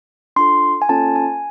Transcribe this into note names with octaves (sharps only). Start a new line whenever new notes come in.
D4 F4 A4 C6
G#5
A#3 C#4 F4 A4 A5
G#5